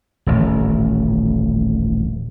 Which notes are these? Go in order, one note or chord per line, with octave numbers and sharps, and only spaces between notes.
D#1 A1